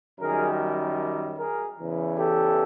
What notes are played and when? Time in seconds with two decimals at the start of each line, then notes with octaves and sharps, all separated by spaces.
0.20 F#2 D#3 G3 G#4 A#4
1.39 G#4 A#4
1.78 E2 C#3 E3
2.17 G4 A4